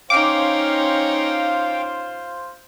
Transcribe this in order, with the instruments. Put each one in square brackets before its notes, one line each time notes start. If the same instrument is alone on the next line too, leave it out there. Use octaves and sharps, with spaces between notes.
[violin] C#4 D#4 [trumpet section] F4 C5 [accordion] F5 G5 [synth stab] D6